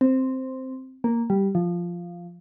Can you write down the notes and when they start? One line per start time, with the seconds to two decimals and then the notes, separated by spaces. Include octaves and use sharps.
0.01 C4
1.04 A#3
1.30 G3
1.55 F3